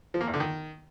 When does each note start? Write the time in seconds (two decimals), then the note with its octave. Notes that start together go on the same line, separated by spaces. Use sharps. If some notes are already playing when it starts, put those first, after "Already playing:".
0.14 F3
0.21 A#3
0.27 E2
0.34 D3
0.40 D#3